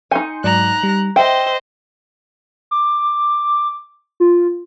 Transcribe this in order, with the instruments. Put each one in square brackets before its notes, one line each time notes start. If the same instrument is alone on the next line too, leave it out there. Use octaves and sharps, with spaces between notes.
[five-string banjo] D#4 G#5 [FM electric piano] C6 G6 C#7
[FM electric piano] G#2 F#3 D5 [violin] A#5 F#6
[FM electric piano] G3
[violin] C5 D#5 [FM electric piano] E5 [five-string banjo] G5
[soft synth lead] D6
F4